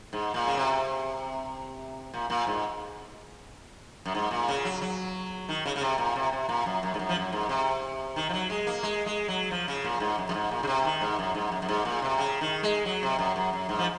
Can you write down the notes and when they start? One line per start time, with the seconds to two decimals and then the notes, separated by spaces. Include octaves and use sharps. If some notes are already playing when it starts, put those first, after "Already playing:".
0.13 G#2
0.34 A#2
0.47 C#3
0.57 C3
2.14 A#2
2.30 A#2
2.47 G#2
4.06 F#2
4.15 G#2
4.31 A#2
4.48 C#3
4.65 F#3
4.82 F#3
5.49 D#3
5.65 C#3
5.76 C#3
5.81 C3
5.98 A#2
6.16 C3
6.32 C3
6.49 A#2
6.66 F#2
6.83 F#2
6.94 G#2
6.99 F#2
7.09 F3
7.16 F#2
7.33 G#2
7.49 C3
8.16 D#3
8.29 F3
8.33 F#3
8.50 G#3
8.67 A#3
8.83 G#3
9.06 G#3
9.28 F#3
9.51 F3
9.68 C#3
9.84 A#2
10.00 G#2
10.18 F#2
10.29 F#2
10.34 G#2
10.51 A#2
10.63 C#3
10.67 C3
10.85 D#3
11.01 G#2
11.19 F#2
11.35 G#2
11.52 F#2
11.62 F#2
11.69 G#2
11.85 A#2
12.02 C3
12.19 C#3
12.41 D#3
12.63 G#3
12.85 F#3
13.03 C3
13.19 F#2
13.36 F#2
13.53 F#2
13.69 G#2
13.79 F3